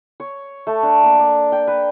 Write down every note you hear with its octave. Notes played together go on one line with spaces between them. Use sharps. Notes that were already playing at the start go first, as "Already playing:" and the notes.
C#5
A3
D4
A#3
D5
G5
B4